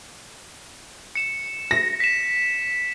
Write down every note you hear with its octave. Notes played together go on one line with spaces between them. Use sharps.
C#7 E7
A#6
B6 E7